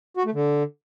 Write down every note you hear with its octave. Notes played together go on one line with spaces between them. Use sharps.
F#4
A3
D3